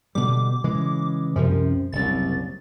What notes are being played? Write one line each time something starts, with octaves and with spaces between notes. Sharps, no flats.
B2 D3 G3 D6
C#3 E3 G#3
C2 F#2 C3 F3
F#1 C2 A6